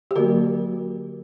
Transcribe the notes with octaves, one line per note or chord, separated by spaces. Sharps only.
G4
D3 F#3 A#3 F#4 A#4